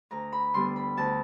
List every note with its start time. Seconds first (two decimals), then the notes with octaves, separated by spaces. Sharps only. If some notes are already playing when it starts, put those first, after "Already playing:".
0.11 D2 A#5
0.33 B5
0.54 D3 G3 B3 C6
0.76 B5
0.97 D2 A5